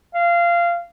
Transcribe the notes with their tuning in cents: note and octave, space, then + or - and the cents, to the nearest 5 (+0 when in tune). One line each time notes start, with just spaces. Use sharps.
F5 -20